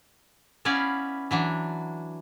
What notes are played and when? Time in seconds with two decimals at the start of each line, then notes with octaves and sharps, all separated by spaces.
0.65 B3 C#4 E4 B4 D5 F5
1.31 E3 F#3 D4